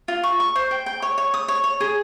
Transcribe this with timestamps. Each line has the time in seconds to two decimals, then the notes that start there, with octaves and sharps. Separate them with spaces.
0.08 F4
0.23 C#6
0.40 C#6
0.56 C5
0.71 G5
0.86 G5
1.02 C#5
1.18 C#5
1.34 D#6
1.48 C#5
1.64 C#5
1.80 G#4